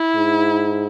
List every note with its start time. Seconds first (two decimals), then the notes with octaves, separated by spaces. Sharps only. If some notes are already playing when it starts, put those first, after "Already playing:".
Already playing: E4
0.15 G#2